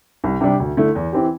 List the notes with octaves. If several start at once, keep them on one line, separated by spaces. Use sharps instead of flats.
C2
C3 G3 D4 G4
D2
D3 A3 E4
E2
E3 C4 G4